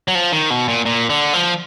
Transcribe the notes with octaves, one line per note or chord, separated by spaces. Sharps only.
F#3
F3
D#3
B2
A#2
A#2
D3
F3